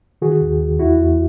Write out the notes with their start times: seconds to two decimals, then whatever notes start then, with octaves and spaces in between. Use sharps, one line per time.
0.22 D#3 F#4 G#4
0.42 D#2
0.61 D#2
0.79 E2 E4 F#4
0.98 E2